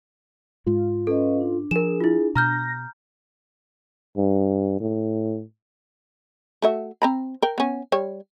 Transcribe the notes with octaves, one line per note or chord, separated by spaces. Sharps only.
G#2 G#3 F4
C#4 A4 B4 D#5
D4
F3 G#4 A#4 E7
E4 F4
B2 A#5 F6 G6 A#6
G2
A2
A3 F#4 E5
C4 A#5 B5
A#4 G5
B3 C#4
G3 C#5